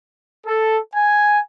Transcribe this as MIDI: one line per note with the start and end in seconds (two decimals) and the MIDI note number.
0.46 0.78 69
0.94 1.39 80